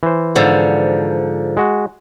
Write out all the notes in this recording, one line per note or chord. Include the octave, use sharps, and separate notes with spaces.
E3 C5
G#2 D3 F3
G#3 F#4